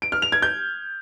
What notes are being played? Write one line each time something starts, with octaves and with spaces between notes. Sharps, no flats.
D7
F6
F7
G#6
G6